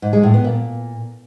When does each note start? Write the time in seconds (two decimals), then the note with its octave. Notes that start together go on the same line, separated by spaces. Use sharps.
0.02 G#2
0.13 G#3
0.23 A2
0.34 B3
0.44 A#2